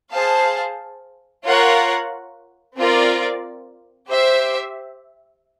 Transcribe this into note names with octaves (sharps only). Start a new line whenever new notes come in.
G#4 C5 F5 A5
F4 A#4 C#5 F#5
C4 F4 A#4 D5
G4 C5 E5